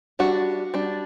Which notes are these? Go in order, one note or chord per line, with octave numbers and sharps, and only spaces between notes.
G3 D4 F#4
G3 D4